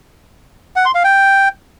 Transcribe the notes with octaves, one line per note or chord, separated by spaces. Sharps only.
F#5
C6
F5
G5